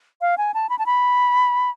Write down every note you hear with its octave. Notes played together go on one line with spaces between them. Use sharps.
F5
G#5
A5
B5
A5
B5